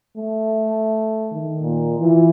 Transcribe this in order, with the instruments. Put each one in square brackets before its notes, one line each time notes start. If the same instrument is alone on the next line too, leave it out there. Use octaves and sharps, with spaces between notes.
[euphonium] A3
[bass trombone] D#3
[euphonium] A#2
[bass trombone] E3 [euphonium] F4